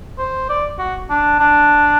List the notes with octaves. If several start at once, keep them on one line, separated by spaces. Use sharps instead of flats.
C5
D5
F#4
D4
D4